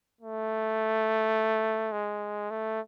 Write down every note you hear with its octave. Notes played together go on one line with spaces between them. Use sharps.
A3
G#3
A3